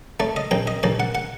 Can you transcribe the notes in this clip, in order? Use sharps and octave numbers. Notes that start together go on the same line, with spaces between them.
A3 D5
D#5
A#1 G5
D#5
A#1 D5
F#5
F#5